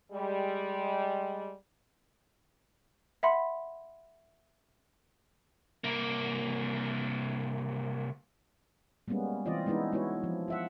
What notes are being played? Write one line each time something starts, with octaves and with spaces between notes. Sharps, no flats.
G3 G#3
E5 F#5 B5 C6
C2 A#3
G3 G#3 A#3 B3 C#4
E3 C4 F4 D5 D#5
G#3 B3 C#4 D#4 E4
G#3 B3 E4 F#4 C#5
F3
F4 E5 F#5